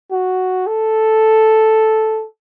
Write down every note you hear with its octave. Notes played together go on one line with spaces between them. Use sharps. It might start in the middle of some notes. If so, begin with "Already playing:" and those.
F#4
A4